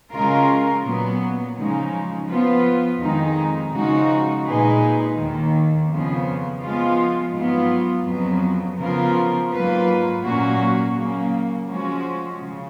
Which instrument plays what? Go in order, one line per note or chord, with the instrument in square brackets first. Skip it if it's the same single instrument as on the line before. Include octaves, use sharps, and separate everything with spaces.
[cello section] C#3 G#3 C#4 F4 A#4
A#2 F#3 B3
C#3 F3 G#3 D#4
F3 B3 F4 B4
F2 D#3 G#3 D#4
C#3 F3 G#3 D#4 F#4
A#2 G#3 D#4 G#4 B4
D#2 D#3 A#3
F2 C#3 F3 B3
F3 G#3 B3 F4
G#2 F#3 B3 F4
F2 C#3 F#3 B3
C#3 F3 B3 F4 A#4
G#2 F#3 A#3 F4 B4
A#2 F#3 A#3 C#4 F#4
C#3 F#3 A#3
F3 G#3 C#4 F#4
C#3